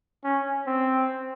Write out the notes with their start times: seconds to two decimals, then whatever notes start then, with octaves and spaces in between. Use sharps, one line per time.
0.24 C#4
0.67 C4